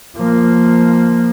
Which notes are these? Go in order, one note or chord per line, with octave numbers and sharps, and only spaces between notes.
F3 A#3